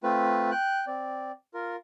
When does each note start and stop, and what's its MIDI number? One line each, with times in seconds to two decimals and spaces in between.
0.03 0.51 57
0.03 0.51 60
0.03 0.51 65
0.03 0.51 71
0.51 0.85 79
0.51 0.85 90
0.87 1.32 60
0.87 1.32 74
1.54 1.76 65
1.54 1.76 70